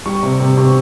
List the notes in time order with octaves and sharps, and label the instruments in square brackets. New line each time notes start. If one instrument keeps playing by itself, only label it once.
[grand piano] G3 C#6
C3
C3
C3 C#6